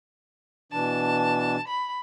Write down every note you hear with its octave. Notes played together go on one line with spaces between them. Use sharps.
B2 E3 D4 A5
B5